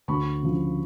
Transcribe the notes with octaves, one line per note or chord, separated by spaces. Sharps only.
D2 B5 C#6
C#3 F3